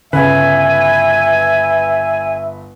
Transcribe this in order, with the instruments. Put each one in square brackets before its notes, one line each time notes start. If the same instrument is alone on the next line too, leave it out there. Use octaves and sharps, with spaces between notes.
[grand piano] G1 B4 [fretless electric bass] C#3 [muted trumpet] E5 [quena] G#5